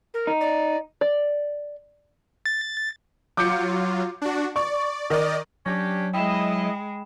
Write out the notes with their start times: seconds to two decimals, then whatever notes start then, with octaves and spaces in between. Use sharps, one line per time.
0.14 A#4
0.27 D#4
0.41 D5
1.01 D5
2.46 A6
3.37 F#3 F4 D6 G6 C#7
4.22 D4 F#4
4.56 D5 C#6
5.10 D#3 D5 D#5
5.66 F#3 C#4 D4 G4 A#6
6.14 G#3 E4 D#5 G5 B5 E7